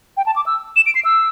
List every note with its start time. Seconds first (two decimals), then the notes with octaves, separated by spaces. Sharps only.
0.17 G5
0.26 A5
0.36 D6
0.46 E6
0.76 E7
0.86 D7
0.95 C7
1.05 E6